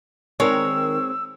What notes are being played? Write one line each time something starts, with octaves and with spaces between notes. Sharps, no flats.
D#3 G#3 C4 A#4 C#5 E6